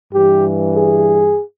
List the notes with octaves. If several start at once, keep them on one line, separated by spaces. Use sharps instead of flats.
G2 E3 G4
G#4